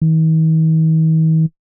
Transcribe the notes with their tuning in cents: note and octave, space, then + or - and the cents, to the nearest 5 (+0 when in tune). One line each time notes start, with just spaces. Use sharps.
D#3 +45